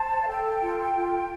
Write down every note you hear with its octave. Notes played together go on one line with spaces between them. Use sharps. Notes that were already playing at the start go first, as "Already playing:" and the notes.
Already playing: C5 A5
F5
A4 G5
F4
F4